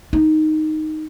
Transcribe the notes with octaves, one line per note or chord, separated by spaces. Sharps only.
D#4